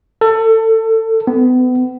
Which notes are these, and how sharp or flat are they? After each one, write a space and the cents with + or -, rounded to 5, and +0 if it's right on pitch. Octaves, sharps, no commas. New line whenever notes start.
A4 +25
B3 +35